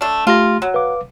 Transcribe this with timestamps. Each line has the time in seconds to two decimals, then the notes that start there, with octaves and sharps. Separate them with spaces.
0.01 A3 D4
0.27 A3 F4 G4 A#6
0.62 F#3
0.74 B4 F5 D6